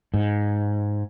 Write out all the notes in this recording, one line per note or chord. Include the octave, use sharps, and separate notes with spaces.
G#2